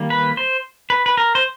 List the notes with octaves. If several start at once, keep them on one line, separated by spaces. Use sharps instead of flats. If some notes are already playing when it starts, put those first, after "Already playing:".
Already playing: D#3 G3 A#3
B4
C5
B4
B4
A#4
C5